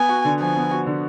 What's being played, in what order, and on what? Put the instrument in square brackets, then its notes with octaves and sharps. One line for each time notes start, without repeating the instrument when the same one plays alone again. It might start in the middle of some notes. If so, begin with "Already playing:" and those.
Already playing: [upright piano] B3 [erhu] G#5
[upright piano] F#4
D3
[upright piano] F3 [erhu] G#5
[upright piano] B3
F#4
D3